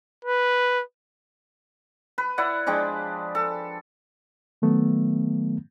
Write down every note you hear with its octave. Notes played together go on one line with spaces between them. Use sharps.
B4
B4
E4 D5 F#5
F3 G#3 D4 G4
A4
D#3 F#3 A3 B3